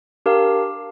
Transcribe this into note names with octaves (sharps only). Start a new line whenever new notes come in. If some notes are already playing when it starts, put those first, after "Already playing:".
D4 G4 A#4 F5